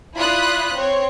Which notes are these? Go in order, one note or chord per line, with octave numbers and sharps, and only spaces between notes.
E4 F4 D5 B5 D#6 F#6
C4 C#5